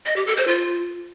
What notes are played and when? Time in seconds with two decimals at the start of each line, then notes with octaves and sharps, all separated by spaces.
0.06 D#5
0.16 G4
0.27 A4
0.37 C5
0.48 F4